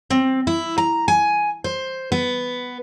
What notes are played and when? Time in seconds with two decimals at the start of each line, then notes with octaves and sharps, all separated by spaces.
0.10 C4
0.47 E4
0.78 A#5
1.08 G#5
1.64 C5
2.12 B3